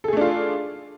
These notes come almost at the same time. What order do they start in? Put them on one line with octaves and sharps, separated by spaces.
A4 G#4 A3 D4 F4